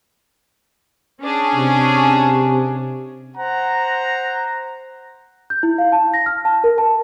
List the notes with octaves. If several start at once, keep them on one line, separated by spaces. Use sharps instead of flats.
C#4 D4 G#4
C3
C5 F#5 A#5
G6
E4
F5
A5
A#6
F6
A5
A#4
A5